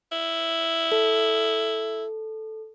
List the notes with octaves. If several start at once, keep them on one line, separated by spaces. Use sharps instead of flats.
E4
A4